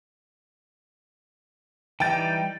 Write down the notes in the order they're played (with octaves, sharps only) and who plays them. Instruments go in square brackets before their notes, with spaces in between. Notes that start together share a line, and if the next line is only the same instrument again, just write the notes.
[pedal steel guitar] E3 G3 D#4 [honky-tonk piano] G5 A6